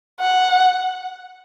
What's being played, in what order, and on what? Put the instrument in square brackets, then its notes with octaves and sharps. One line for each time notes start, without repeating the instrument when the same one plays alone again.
[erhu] F#5